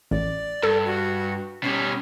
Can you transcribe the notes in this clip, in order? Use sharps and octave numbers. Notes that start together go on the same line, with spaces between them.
A1 D5
G2 A4
F#4
B2 G3 C#4